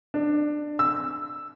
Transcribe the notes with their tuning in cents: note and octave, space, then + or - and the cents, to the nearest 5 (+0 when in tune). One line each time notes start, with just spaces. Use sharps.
D4 +20
E6 +0